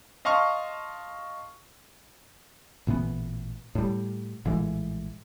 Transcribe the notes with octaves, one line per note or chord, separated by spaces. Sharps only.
D#5 F5 A5 C6 C#6 F6
A1 A#2 E3 B3
A2 G3
A#1 A2 E3 G#3